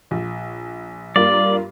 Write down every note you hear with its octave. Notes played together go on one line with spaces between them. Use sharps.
A#1
G2 A#3 F4 D5